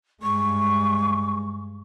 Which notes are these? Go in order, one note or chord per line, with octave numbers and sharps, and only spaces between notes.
G2 G#3 C#6